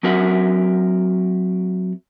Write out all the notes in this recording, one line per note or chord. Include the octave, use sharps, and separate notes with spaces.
F#3 C4 F#4 A#4 E5 F#5